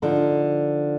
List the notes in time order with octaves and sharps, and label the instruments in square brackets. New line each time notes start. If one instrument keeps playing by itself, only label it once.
[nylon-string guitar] D3 F3 D#4